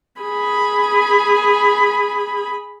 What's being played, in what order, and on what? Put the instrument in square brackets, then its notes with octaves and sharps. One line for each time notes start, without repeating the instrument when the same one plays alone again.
[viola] G#4 B5